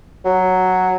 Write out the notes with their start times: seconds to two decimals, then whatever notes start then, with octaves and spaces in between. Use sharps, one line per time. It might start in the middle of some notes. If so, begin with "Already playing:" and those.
0.25 F#3